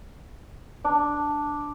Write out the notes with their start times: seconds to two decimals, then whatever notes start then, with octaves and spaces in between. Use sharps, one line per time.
0.85 D4